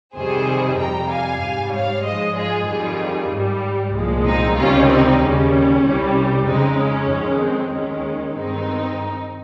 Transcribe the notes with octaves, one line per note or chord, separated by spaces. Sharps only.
F2 C3 D#3 G3 G#4 C5
F2 C3 G3 G5 A#5
F5 G#5
G#2 G3
C#5 F5
G#2 F3 G#3 C5 D#5
F4 G#4
F2 D#3 G3 F4 G#4
G#2 G3
C2 A#2 F3 G#3
C4 D#4
C#2 C3 D#3 G3 C#4 F4
C4 D#4
D#2 C#3 G3 C#4
C2 C3 G3
F2 C#3 G#3 C4 D#4
C#4
F2 D#3 G#3
C4
D#2 D#3 G#3 C#4
G2 D#3 G#3 C4 D#4